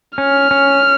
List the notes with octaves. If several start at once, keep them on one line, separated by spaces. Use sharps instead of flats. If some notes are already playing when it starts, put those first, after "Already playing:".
C#4 F6
C#4